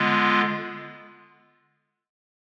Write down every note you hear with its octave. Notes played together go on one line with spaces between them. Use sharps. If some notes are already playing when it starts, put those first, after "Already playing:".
Already playing: D3 G#3 B3 F4